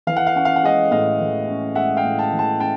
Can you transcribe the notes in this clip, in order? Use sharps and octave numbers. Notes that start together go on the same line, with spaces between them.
E3 F5
F#5
F5
C#4 F#5
F5
F#5
G#3 D#5 F5
A2 D#5 F5
E3
C#4
G#3 E5 F#5
F5 G5
A2
G5 A5
E3
G5 A5
C#4 G5 A5